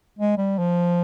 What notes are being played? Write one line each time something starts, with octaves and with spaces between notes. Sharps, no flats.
G#3
G3
F3